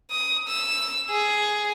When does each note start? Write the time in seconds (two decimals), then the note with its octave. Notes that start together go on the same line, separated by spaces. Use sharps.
0.11 D#6
0.48 E6
1.10 G#4